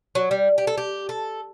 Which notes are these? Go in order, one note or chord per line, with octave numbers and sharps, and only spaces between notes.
F#3
G3
G4
A4
G4
A4